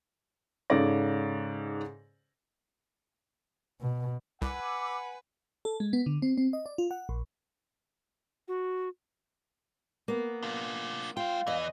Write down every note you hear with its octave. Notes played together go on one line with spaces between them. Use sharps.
G#2 C#3 A4 C#5 D5 A#6
B2
C2 B4 F#5 G#5 D6 E6
A4
G#3
B3
D3
C4
C4
D#5
D5
F4
F#5
A#1
F#4
A#3 B3
D4 F4
G#3 F4 F5 G5
E2 E3 D#5